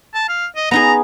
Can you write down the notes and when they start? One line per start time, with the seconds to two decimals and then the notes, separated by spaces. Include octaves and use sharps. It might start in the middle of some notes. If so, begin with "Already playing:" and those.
0.14 A5
0.29 F5
0.56 D#5
0.71 B3 D#4 G#4 A#5